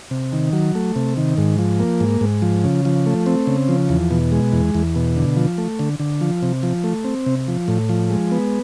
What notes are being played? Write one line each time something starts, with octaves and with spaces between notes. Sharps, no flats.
C3
D#3
F#3
A3
C3
D#3
G#2
F3
A#3
G#2
G#2
F3
C#3
F3
A3
C4
C#3
F3
E2
B2
G#3
E2
E2
B2
D3
F3
A3
D3
D3
F3
C3
F3
A3
C4
C3
F3
A2
F3
G#3
B3